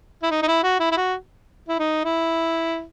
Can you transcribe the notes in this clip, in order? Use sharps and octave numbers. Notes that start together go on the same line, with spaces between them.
E4
D#4
D#4
E4
F#4
E4
E4
F#4
E4
D#4
E4